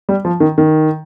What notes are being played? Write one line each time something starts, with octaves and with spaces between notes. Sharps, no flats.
G3
F3
D#3
D#3